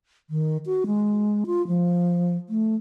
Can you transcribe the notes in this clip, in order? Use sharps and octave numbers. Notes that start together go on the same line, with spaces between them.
D#3
F#4
G#3
F4
F3
A3